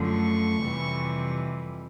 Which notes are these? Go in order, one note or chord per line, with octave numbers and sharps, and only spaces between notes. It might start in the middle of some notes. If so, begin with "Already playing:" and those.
Already playing: F#2 D3 F3 A3
C#6
F2 C3 E3 G3